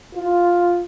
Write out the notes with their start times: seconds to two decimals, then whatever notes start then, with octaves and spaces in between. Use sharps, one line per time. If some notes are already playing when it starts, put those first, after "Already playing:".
0.15 F4